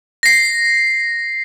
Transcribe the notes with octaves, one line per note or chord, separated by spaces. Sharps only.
A#6 C7